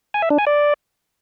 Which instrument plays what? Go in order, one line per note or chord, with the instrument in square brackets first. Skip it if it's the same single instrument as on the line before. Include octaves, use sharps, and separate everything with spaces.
[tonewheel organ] G#5
E5
D4
G#5
D5